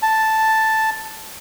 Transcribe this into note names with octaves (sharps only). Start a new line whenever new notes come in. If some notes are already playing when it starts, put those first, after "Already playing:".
A5